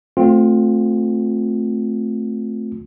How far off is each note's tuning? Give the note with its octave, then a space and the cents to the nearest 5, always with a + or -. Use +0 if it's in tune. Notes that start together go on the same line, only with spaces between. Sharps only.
A3 +0 C4 +0 F4 +30